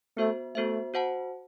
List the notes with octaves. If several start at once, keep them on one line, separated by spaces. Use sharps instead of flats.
A3 B3 F#4 C5 E5
A3 B3 F#4 C5 E5
F#4 C5 F#5 A5